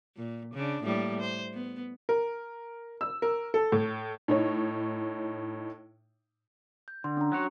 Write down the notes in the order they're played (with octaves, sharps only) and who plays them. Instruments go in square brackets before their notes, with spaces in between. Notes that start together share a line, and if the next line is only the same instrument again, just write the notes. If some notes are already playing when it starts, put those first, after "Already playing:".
[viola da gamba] A#2
C#3 D4
A2 G3 A#3
C5
B3
[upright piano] A#4
E6
A#4
A4
A2
[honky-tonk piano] A2 D#4 C#5
[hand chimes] G6
[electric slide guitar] D3 [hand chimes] C6
[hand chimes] C#4 D4 A#5
[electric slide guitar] F#3 F#4 C#5